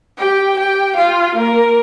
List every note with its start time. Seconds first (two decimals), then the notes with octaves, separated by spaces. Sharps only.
0.19 G4 G5
0.58 G4 G5
0.97 F4 F5
1.37 A#3 A#4